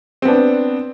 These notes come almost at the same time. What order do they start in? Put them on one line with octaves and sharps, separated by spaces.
C4 B3 D4